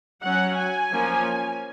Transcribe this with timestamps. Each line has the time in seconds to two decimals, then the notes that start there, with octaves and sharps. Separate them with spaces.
0.24 F#3 C#4 F#5
0.58 G#5
0.92 F3 A#3 C#4